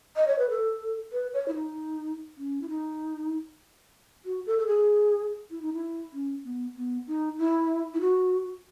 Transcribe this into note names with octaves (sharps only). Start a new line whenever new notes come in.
D#5
C#5
B4
A4
B4
C#5
E4
D#4
C#4
E4
D#4
F#4
A4
A4
G#4
E4
D#4
E4
C#4
B3
B3
D#4
E4
E4
F#4